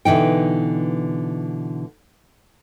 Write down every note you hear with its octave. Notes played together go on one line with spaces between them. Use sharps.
B2 D3 E3 D#4 G5